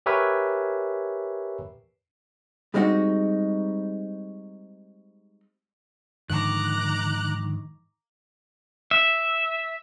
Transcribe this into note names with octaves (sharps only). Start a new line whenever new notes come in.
G4 A#4 B4 C#5 E5 G#5
G3 G#3 C4 D#4 F#4
G#2 D3 D#3 F3 A#5 D6 F#6
E5